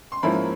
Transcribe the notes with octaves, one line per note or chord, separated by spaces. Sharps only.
C6
G#2 F3 A#3 C#4 E4 B5